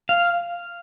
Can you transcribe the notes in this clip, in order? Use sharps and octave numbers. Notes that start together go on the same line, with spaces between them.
F5